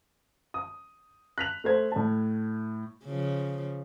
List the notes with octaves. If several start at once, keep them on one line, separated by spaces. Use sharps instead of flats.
D#6
F#6 B6 F7
A3 C5 G#6
A2 A5
C#3 F3